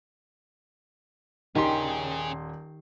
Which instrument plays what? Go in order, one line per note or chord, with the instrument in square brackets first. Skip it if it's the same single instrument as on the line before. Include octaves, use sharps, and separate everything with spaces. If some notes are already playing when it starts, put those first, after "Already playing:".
[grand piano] D#1 C6 [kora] D#3 G4 [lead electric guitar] C#4 G#4